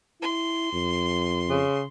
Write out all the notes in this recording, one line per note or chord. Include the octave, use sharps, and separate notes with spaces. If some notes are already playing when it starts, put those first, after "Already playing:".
E4 C6
F2
C#3